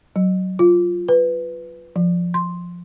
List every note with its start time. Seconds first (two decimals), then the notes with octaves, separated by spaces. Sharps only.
0.16 F#3
0.59 F4
1.08 B4
1.96 F3
2.34 C6